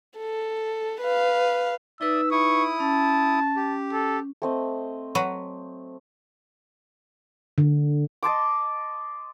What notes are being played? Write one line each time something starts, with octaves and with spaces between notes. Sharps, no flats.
A4
B4 F5
D#4 B4 D5 E5 D#6 E6
E4 C#6 D#6
C#4 A5
G4
A4
A3 C4 D#5
F#3 F#4 B4
D3
D#5 A5 C6 D6